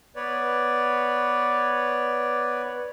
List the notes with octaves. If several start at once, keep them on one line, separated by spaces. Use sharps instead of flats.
B3 B4 C#5 D5